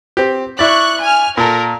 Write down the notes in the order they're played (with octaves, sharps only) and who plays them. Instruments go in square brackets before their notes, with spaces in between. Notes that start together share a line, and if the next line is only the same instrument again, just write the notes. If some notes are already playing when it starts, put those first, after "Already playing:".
[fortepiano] C4 G4
[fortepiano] E4 D5 [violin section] C#6 F#6
[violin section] G#5 F6
[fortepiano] A#2 A4 [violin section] A#4